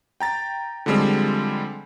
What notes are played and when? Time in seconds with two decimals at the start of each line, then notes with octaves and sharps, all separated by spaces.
0.20 G5 A#5 A6
0.86 D3 F3 G3 G#3 C4